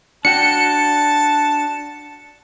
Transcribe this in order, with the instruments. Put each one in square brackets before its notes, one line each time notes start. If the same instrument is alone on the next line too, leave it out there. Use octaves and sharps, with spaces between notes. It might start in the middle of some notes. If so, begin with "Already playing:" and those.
[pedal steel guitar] D4 F#4 G5 [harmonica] A5 [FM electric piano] C#7